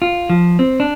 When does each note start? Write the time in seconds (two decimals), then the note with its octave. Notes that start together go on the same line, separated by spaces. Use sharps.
0.02 F4
0.30 F3
0.59 C4
0.80 D4